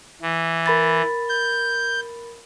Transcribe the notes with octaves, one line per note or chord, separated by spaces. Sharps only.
E3
A#4 B5 A6
G6